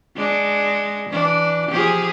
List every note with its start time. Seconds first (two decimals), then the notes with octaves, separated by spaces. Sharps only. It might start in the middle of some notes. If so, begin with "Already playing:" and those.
0.16 G#3 D4
1.10 E3 D4
1.69 F3 G4 G#4